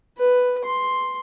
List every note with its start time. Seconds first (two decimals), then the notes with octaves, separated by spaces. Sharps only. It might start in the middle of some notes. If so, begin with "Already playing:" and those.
0.18 B4
0.64 C6